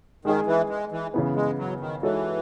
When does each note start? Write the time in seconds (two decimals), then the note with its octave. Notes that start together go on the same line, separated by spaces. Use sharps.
0.25 D#3 G#3 D#4 G#4
0.46 E3
0.69 G#3
0.92 E3
1.14 C#3 E3 B3
1.36 G#3
1.58 F#3
1.80 D#3
2.02 E3 G#3 D#4 F#4 A4 C#5